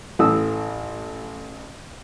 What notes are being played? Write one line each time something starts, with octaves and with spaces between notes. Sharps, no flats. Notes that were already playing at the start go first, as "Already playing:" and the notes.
A1 E3 A4 D#6 E6